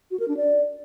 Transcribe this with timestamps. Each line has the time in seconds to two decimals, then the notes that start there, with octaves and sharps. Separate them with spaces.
0.11 F#4
0.20 A#4
0.28 D4
0.37 D5